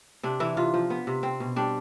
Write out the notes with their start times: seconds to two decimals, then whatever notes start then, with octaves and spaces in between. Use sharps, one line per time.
0.23 C3 D4
0.40 E3 E4
0.57 C3 F4
0.74 F3
0.90 B3
1.07 C3
1.23 C4
1.40 B2
1.56 G3 D4